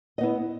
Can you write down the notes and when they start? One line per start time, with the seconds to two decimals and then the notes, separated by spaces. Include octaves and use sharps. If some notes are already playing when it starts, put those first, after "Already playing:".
0.18 D#5
0.21 B3
0.23 E4